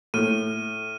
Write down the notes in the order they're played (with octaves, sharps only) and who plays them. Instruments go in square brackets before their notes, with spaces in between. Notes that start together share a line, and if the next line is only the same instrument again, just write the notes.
[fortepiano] A2 [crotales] F6 D#7